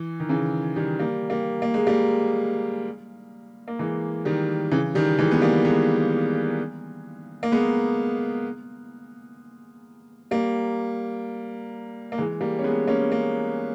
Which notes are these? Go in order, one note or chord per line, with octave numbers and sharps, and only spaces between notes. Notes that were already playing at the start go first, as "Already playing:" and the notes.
Already playing: E3
D#3
C#3 E3
D#3 G3
G3 A#3
G3 A#3
A#3
G#3
G3 A#3
A#3
E3 G#3
D#3 G3
C#3 E3
D#3 G3
E3 G#3
B3
G3 A#3
G#3 B3
A#3
G#3 B3
G3 A#3
A#3
E3 G#3
G3 A#3
C#4
G#3 B3
A#3 C#4
A#3 C#4